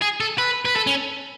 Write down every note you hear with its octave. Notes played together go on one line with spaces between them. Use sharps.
G#4
A4
B4
B4
A4
C#4